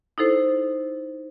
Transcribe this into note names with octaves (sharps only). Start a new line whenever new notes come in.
D#4 E4 A4 C5